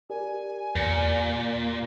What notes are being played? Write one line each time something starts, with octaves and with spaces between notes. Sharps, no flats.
G4 A#4 D5 G#5
E2 A#2 A#6 C#7